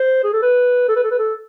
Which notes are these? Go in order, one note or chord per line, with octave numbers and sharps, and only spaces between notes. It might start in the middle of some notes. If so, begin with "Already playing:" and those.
Already playing: C5
G#4
A4
B4
A4
B4
A4
B4
A4